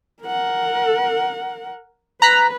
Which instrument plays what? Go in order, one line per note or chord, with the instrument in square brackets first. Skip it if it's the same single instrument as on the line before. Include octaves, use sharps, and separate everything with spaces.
[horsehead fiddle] A#4 F#5
[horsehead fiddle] B4 [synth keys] A#5 F#6 B6